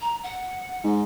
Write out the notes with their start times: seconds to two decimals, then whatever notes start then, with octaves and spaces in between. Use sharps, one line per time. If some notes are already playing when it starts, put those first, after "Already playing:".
0.01 A#5
0.23 F#5
0.84 G#2